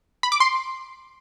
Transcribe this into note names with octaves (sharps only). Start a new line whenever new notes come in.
B5
D6
C6